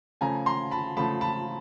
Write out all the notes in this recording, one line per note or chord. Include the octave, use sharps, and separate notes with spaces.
C#3 F3 A3 G#5 A#5
A#5 C6
A5 B5
C#3 F3 A3 A5 B5
A5 B5